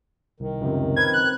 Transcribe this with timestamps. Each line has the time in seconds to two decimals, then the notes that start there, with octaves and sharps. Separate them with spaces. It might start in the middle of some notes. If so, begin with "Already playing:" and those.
0.40 C2 D#3
0.61 C#2 F#2 C3
0.96 C4 A#4 B4 G#6
1.14 F#6